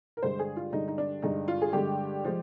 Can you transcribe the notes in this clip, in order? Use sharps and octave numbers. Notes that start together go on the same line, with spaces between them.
A#4
G2 D3 G#3 C5
G#4
F4
G2 D3 G#3 D#4
D#4
D4
G2 D3 G#3 D#4
F4
G#4
G2 D3 G#3 G4
F3 G#3